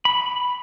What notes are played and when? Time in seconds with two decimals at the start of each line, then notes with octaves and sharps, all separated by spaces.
0.05 B5